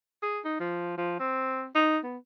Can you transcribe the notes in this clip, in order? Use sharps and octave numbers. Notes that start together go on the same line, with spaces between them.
G#4
D#4
F3
F3
C4
D#4
B3